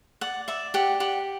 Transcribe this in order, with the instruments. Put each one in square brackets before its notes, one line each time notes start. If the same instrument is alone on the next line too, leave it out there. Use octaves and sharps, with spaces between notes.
[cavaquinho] D5 F#5
D5 E5
G4 F#5
G4 F#5